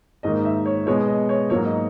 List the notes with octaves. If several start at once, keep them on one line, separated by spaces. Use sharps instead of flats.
G#2 D#3 A#3 D#5
E5
C#5
B2 G#3 B3 C#5
D#5
C#5
G#2 F#3 A#3 C#5
D#5